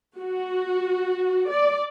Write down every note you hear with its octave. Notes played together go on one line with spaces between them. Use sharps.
F#4
D5